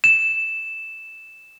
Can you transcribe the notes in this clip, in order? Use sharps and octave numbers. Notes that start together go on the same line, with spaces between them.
E7